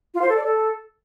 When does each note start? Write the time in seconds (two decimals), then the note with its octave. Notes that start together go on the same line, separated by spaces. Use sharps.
0.14 F4
0.22 C5
0.29 A4
0.36 D5
0.44 A4